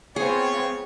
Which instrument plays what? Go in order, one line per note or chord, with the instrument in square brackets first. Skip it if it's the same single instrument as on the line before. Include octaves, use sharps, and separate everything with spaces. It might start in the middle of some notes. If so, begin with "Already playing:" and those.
[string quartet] B3 C4 F4 [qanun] G#4 [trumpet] C#5